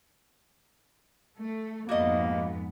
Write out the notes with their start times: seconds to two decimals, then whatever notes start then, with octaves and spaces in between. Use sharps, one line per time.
1.38 A3
1.89 F2 G#2 A#3 B3 F#4 A4 D#5